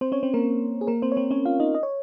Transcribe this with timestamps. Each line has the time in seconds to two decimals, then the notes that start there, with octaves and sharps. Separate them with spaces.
0.01 C4 C5
0.12 C#4 C#5
0.23 C4 C5
0.34 A#3 A#4
0.81 G#4
0.87 A#3 A#4
1.02 C4 C5
1.12 C#5
1.17 C4 C5
1.31 C#4 C#5
1.45 F4 F5
1.60 D#4 D#5
1.75 D#5
1.83 C#5